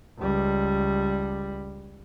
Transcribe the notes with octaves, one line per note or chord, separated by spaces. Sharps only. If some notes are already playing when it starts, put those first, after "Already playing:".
C#2 G3